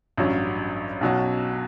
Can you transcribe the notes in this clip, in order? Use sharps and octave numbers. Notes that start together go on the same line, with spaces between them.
A1 G2 F#3 C#4
B1 B2 F#3 C#4